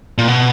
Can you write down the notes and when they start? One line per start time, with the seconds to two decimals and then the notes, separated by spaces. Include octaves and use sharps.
0.18 A#2
0.28 B2